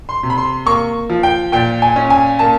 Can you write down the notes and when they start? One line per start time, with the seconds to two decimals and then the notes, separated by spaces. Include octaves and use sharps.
0.09 C6
0.23 C3
0.30 B5
0.38 C6
0.66 A#3 C#6
1.09 F3
1.23 G5
1.52 A#2 G5
1.82 G#5
1.96 C#4
2.10 G#5
2.39 A#3 A5